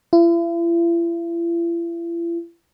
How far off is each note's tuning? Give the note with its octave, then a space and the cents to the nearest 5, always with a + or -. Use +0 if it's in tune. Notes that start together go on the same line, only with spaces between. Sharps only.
E4 +45